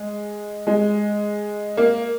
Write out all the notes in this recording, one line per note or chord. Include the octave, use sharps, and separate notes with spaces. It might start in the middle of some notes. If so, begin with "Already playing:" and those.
Already playing: G#3
G#3
A#3